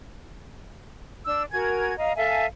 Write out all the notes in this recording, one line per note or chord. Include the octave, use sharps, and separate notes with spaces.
D4 E6
F#4 A#4 G#5 G#6
D#5 F5 A#5
A4 E5 F5 G#5